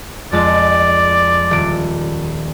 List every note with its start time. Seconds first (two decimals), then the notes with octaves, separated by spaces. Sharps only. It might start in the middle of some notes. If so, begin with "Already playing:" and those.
0.32 F2 G#3 D5 A6
1.51 D#1 D7